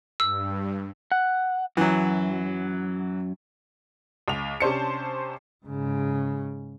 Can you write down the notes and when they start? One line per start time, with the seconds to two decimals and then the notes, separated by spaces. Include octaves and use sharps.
0.20 G2 E6
1.12 F#5
1.77 F#2 E3 F#3
4.28 C#2 F7
4.60 C3 C#4 D4 C5 A5 C#7
5.65 G#2 C#3